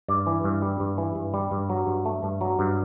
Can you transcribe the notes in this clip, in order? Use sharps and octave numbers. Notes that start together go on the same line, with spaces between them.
G2 D5
E3
G2
G3
G2
E3
G2
G3
G2
F#3
G2
A3
G2
F#3
G2